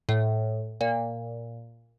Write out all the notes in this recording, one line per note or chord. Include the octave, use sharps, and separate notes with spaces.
A2
A#2